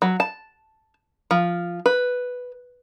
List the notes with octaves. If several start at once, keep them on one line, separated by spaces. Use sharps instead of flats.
F#3
A5
F3
B4